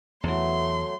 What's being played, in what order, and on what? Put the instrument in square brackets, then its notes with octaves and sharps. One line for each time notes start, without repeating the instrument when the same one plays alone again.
[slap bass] E2 E3 [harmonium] F#3 A3 [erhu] C6